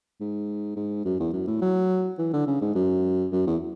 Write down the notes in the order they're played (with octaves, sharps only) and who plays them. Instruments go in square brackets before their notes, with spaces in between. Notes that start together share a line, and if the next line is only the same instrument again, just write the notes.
[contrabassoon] G#2
G#2
F#2
E2
F#2
A2
F#3
E3
D3
C#3
G#2
F#2
F#2
E2